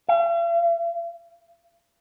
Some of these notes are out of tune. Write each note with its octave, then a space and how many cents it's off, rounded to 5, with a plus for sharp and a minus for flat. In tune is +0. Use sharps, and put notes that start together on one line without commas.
F5 -45